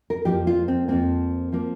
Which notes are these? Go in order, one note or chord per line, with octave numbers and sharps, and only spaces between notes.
A#4
F2 F3 A#3 G4
F4
C4
F2 F3 A#3 C4
F3 A#3